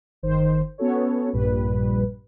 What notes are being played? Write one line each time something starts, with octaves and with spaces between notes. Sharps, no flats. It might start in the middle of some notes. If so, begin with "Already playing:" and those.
G1 D#3 C5
B3 C#4 F#4 A4 C#5
A#1 G2 A#2 G3 B4